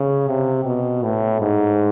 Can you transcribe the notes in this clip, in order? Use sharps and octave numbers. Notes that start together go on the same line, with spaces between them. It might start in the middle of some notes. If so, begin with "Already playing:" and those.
Already playing: C#3
C3
B2
A2
G#2